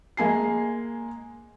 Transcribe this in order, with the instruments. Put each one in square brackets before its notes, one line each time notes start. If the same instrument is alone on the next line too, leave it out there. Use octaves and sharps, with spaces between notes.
[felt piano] G#3 A#3 G#5 C7